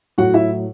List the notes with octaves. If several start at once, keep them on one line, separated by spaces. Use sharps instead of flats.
A2 F#3 F#4 F#5
E4 E5